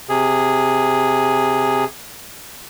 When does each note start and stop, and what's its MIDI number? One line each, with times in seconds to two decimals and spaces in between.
0.09 1.84 48
0.09 1.84 68